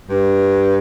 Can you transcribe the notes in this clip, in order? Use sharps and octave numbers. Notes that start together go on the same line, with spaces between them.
G2